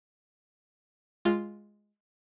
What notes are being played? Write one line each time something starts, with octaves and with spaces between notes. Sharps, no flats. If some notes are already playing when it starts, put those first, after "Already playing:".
G#3 F4